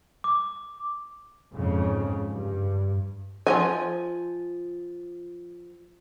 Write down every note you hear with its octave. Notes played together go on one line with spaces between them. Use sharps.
D6
F2 G#2 C#3
G2
F3 F#3 G#5